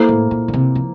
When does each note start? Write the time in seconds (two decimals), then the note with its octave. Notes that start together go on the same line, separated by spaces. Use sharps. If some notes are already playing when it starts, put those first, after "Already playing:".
Already playing: A#3 E4 A4 C5
0.08 A2
0.31 A#2
0.48 D3
0.53 C3
0.75 F3